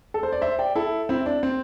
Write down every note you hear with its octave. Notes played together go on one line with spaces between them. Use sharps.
A4
C5
D5
C5 E5
D5 G5
E4 A4
C4 E4
D4
C4